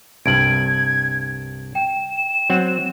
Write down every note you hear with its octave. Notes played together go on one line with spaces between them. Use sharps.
C2 G2 G#6 D7 F#7
G5 E7
F#3 C4 F#5